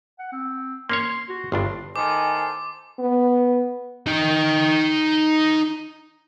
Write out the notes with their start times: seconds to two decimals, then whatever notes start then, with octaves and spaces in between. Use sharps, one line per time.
0.19 F#5
0.32 C4
0.90 A#3 C#4 C#5 C6
1.29 F#4
1.52 G1 G2 D4 C6
1.96 A2 D#3 A4 C5 G#5 D6
2.99 B3
4.07 D#4 G5